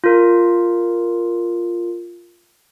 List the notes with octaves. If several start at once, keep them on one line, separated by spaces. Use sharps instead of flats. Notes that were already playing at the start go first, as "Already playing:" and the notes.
F4 A#4